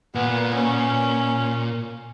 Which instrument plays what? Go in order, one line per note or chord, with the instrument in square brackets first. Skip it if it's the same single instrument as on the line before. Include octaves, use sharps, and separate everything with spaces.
[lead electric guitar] A#2 [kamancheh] B3
[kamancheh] C#4